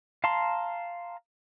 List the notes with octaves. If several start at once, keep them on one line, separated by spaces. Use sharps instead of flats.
F5 A5 A#5 C6